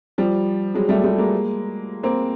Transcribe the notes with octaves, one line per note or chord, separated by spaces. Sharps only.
F3 G3
F#3 G#3
G3 A3
G3 A3
G#3 A#3
A#3 C4